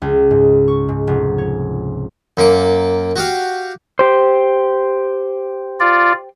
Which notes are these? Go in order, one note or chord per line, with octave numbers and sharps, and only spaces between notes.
C#2
G#2
C#6
G#2
F1
C#5
F#2 A#3 D6
F#4 G4 F5
G4 C5
F4 D5